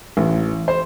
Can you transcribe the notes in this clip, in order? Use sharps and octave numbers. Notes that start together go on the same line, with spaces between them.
A1
C5